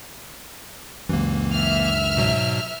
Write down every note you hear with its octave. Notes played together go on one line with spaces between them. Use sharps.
C#2 F#2 E3 A#3
E5 F6
G#2 B2 F#3